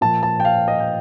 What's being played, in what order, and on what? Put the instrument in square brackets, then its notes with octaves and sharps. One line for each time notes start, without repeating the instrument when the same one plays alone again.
[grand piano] A#2 F3 A5
A5
G5
F5
D#5
G5